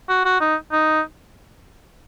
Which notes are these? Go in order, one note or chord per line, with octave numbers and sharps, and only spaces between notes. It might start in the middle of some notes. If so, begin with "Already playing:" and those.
F#4
F#4
D#4
D#4